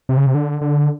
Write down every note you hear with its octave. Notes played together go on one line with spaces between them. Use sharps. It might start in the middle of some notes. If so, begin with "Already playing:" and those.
C3
C#3
C3
D3
D3